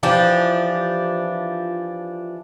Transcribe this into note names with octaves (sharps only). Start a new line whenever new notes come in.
E3 F3 D4 G4